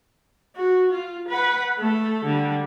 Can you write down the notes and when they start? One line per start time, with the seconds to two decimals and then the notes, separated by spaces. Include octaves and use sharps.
0.56 F#4
0.92 F4
1.28 B4 F#5
1.78 A3 A4
2.25 D3 G3